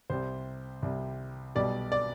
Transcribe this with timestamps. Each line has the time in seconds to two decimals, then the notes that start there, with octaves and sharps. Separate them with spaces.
0.10 C2 C3 G3 C5
0.82 C2 C3 G3
1.55 B1 B2 G3 D5
1.92 D5